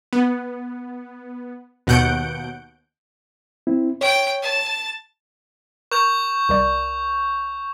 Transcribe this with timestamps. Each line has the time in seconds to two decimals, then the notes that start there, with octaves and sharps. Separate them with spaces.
0.13 B3
1.87 D#2 B2 F#5 G6 D7
3.67 C4 E4
4.01 C#5 G5
4.42 A5
5.92 A#4 C#6 G6 F7
6.49 C2 A#4 D5